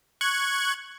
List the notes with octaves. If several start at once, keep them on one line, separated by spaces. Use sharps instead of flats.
C#6 F#6 G#6